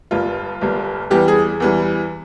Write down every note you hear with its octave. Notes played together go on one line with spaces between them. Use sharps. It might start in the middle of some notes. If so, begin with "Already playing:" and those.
G1 G2 G3 A#3 F4
G1 G2 G3 A#3
E2 E3 G3 G4
G#4
E2 E3 G3